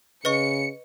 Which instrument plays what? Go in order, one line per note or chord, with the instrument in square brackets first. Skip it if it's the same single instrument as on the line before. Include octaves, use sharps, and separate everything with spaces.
[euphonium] C#3 [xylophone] B4 D#5 C#6 [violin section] C#7